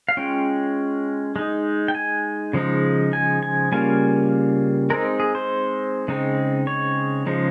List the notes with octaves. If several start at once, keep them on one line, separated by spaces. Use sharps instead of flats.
F5
G#3 C#4 F4 G5
G#3 D#4
G5
G#5
C#3 F3 G#3 D#4
G#5
G#5
C#3 G3 A#3 C#4 F4 G#5
G#3 C4 D#4 A#4
G#4
C5
C#3 G#3 C4 D#4
C#5
C#3 F3 G#3 D#4